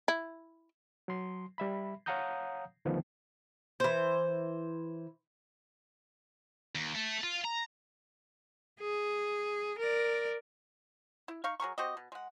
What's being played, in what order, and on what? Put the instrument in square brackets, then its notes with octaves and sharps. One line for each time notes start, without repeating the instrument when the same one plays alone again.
[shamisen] E4
[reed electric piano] F#3 C6
G3 E5 B5
C#5 F5 F#5 A#5 D#6 G6
D2 D#3 F3 B3
[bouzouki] E3 C5
[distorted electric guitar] D#2
A3
F4
A#5
[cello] G#4
A#4 D5
[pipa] E4
D#4 F5 C#6
F#3 G#4 A#4 C#6
C4 F#4 G4 D#5
B2
G#3 F#5